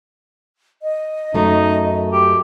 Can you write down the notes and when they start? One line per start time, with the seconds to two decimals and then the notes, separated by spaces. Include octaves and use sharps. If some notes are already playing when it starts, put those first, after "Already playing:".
0.82 D#5
1.34 F#2 A3 D#4
2.12 G4